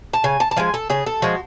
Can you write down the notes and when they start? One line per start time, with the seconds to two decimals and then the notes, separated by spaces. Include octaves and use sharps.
0.13 A5
0.24 C#3 G#5
0.40 A5
0.51 A5
0.56 F3 G#3 G#5
0.74 A4
0.90 C#3 G#4
1.06 A4
1.22 F3 G#3 F#4